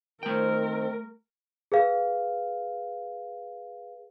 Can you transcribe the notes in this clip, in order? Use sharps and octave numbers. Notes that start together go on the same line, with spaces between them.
D#3 A3 C4 A#4 G5
G#4 B4 F5